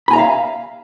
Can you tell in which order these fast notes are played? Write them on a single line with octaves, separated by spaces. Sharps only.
B5 G#5 A#5 E5 F5